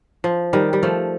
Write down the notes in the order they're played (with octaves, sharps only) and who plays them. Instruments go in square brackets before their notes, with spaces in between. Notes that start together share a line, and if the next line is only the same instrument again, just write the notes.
[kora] F3
D#3 G3
G3
F3 A3